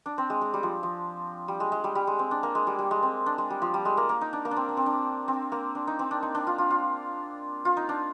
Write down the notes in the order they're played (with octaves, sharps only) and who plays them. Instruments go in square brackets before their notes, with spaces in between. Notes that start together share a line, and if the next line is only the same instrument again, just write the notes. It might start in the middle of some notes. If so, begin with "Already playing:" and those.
[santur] D4
C4
G#3
G#3
G3
F3
F3
G3
G#3
G#3
G3
G3
G#3
C4
D4
A#3
G#3
G3
G3
G#3
C4
D4
G#3
G3
F3
G3
G#3
A#3
A#3
D#4
D4
A#3
D4
C4
D4
C4
D4
C4
A#3
D4
D#4
C4
D4
D#4
D4
F4
F4
F4
F4
D#4
D4